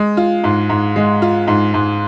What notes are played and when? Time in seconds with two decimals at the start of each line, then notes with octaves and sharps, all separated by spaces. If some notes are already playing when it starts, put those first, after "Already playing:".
Already playing: G#3
0.17 F4
0.44 G#2
0.69 G#2
0.96 G#3
1.22 F4
1.47 G#2
1.74 G#2